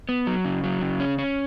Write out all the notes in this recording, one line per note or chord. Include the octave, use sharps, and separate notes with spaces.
B3
F#3
C#3
F#3
C#3
C#4
C#4